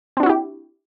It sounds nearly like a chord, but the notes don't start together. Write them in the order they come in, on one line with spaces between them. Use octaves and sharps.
C4 D4 F#4 E4 G4